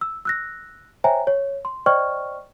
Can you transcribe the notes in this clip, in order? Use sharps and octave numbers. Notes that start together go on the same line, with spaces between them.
E6
E6 F#6 A#6
C5 C#5 E5 G5 G#5 A#5
C#5
C6
C5 D5 D#5 G5 C#6 F6